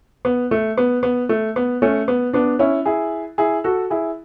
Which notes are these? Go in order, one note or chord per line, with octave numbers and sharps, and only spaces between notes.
B3
A3
B3
B3
A3
B3
A3 C#4
B3
B3 D4
C#4 E4
E4 G#4
E4 G#4
F#4 A4
E4 G#4